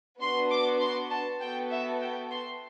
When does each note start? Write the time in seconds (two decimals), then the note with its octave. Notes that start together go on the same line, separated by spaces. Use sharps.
0.20 B3 D4 F#4 C6
0.51 D6
0.81 C6
1.10 A5
1.41 B3 F#4 A4 G5
1.71 E5
2.01 G5
2.30 C6